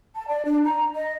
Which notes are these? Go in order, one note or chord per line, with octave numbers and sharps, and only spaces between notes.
A5
D5
D4
A#5
D#5